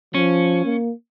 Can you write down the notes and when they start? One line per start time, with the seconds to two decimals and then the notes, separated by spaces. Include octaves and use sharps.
0.14 F3 C#4
0.65 A#3